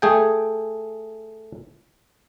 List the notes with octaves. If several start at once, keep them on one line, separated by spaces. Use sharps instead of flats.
A3 G#4 G5